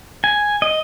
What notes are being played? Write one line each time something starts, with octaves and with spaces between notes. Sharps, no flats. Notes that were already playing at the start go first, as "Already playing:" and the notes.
G#5
D#5